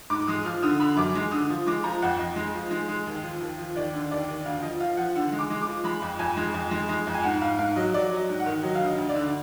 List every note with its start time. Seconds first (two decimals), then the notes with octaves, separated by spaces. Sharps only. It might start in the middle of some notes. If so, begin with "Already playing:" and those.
0.10 G#2 D6
0.28 G#3 D#6
0.45 F3 F6
0.63 D3 D#6
0.80 D3 B5
0.97 F#2 D6
1.15 G#3
1.32 D3 D#6
1.50 F3
1.67 G#3 D6
1.84 F3 A#5
2.02 F2 F#5
2.19 F2 D#5
2.36 G#3
2.54 F3
2.71 G#3
2.89 G#3
3.07 D#2
3.23 F3
3.40 D#2
3.58 F3
3.75 D#2 D5
3.93 D3
4.11 D#2 D5
4.28 D#2
4.45 D2 F5
4.62 F3 D#5
4.80 F3 F5
4.97 F3 F#5
5.15 D3 F#5
5.32 G#3
5.39 D6
5.50 G#3
5.62 D6
5.67 F3
5.84 G#3 B5
6.02 F2
6.19 F2 G#5
6.37 G#3
6.54 F2
6.71 G#3
6.89 G#3
7.07 F2
7.14 G#5
7.23 G#2 F#5
7.42 G#2 F5
7.59 G#2 F5
7.76 F#3 D#5
7.94 F#3 D5
8.11 F#3
8.16 D#5
8.29 G#2
8.40 F#5
8.46 D#3
8.63 F#3 D#5
8.75 D2 F5
8.86 D#5
8.98 D2
9.09 D5
9.15 D3